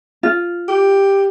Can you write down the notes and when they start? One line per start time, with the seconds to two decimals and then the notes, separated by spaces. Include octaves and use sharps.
0.23 F4
0.68 G4